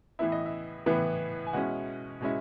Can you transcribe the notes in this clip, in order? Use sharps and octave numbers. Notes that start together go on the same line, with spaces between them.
A2 E3 B3 E4 E5
D#5
E5
A2 E3 B3 E4
G#5
B2 G#3 C#4 E4 F#5
B2 G#3 C#4 E4